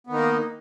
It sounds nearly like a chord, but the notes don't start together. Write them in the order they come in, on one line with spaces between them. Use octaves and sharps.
B3 D#3 D#4 A#3